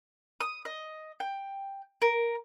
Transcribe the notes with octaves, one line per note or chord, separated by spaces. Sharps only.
D#6
D#5
G5
A#4